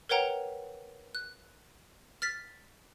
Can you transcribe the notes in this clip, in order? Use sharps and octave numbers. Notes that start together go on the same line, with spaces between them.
A#4 B4 C#5 F#5 G5 A#5
F#6
F6 A6 B6